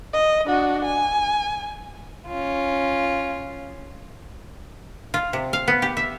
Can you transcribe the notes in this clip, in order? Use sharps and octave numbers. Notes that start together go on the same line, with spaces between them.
D#5
D4 F#4
G#5
C#4 F4
F4
C3
F5
B3
G4
E5